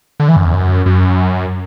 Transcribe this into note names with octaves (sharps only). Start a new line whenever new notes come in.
D3
E3
F#2
E2
F#2
F#2